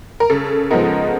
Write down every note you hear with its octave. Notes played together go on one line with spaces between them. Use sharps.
A#4
C#3 A4
F3 G#3 B3 D#4 A#4